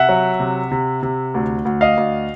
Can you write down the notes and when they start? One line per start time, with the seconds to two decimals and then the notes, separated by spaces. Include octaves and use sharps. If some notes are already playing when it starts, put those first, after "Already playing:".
Already playing: C3 E5 F#5
0.09 F#3
0.40 C3
0.71 C3
1.03 C3
1.34 D2
1.65 D2
1.81 D#5 F5
1.97 D2